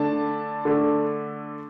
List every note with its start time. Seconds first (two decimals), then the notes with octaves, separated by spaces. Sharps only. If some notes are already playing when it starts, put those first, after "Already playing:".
Already playing: D3 A3 D4 A5
0.65 D3 A3 D4